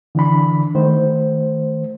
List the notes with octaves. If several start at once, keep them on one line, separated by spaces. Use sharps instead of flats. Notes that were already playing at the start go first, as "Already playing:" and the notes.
D3 E3 D4 B5
D#3 A3 C5